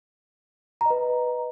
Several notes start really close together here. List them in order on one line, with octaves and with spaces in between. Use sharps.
A#5 D#5 B4